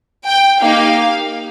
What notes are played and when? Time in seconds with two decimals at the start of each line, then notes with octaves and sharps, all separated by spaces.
0.25 G5
0.61 A#3 D#4 G4 F5